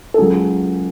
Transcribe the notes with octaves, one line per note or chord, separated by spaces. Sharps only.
A4
C#2 C#3 F#3 G#4